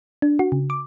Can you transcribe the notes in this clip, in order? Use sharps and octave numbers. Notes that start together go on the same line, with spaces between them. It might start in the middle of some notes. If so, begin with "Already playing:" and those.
D4
F#4
C#3
D6